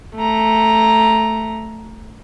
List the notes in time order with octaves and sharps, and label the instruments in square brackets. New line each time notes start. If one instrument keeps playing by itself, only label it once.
[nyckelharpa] A3 A#5